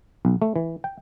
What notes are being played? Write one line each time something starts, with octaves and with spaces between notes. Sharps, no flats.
B1
A3
E3
G5